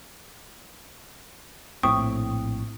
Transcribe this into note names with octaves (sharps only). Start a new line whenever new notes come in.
A#1 A2 C4 G5 C#6 D#6